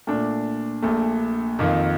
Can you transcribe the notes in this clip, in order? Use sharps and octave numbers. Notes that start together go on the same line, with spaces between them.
A#2 A3 D4
A#1 A#2 A3
F2 D#3 A#3 F4